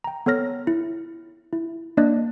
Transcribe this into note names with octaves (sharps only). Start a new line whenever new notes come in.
G5 A#5
B3 A4 C#5 F6 A#6
E4
E4
A#3 D4 D5 D#5 F#6